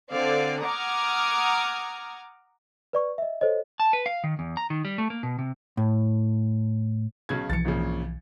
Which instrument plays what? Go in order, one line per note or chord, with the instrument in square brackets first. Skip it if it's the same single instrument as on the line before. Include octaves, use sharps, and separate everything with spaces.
[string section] D3 C4 D5 F5
F#5 A#5 D6 D#6 F6 G#6
[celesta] B4 D5 C#6
D#5 E5
A4 C5 C#5 D#5
[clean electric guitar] A5
B4
F5
D#3
E2
A#5
D#3
G3
A3
A#3
B2
C3
[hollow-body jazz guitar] A2
[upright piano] B1 C#3 G#6
[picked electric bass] B1 E3 F3 [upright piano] A6 C#7
[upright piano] G#1 A#2 C#3